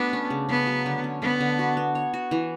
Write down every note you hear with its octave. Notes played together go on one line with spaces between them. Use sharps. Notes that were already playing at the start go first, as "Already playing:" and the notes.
Already playing: A3 B3 D4 F#4
C#4
C#3
C#3 B3
F#3
D3
C#4
D3 B3
D3
F#4
B3
C#5
F#4
E3